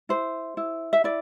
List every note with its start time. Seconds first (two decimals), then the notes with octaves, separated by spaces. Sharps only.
0.09 E4 C5
0.57 E4
0.93 E5
1.04 E4 D5